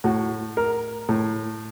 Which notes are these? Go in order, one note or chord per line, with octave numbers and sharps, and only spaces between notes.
A2 F#4
A#4
A2